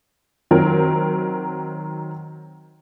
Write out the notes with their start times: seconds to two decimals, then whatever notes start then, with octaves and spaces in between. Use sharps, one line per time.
0.51 D#3 F#3 C4 A#4